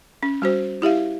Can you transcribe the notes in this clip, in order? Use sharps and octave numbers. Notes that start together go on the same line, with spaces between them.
C#4
G3 F#4 C5
E4 G4 E5 F5